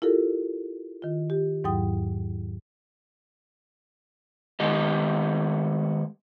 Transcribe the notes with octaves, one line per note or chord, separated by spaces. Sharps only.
E4 F4 G4 A4 A#4
D#3 F4
G4
E2 G#2 F#3 E4 G5 D#6
D#3 G#3 B3 G4 D#5